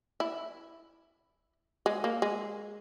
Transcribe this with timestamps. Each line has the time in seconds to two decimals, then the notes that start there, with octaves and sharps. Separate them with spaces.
0.20 E4
1.86 G#3
2.04 A#3
2.22 G#3